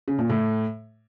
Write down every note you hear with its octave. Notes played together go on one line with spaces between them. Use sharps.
C#3
A#2
A2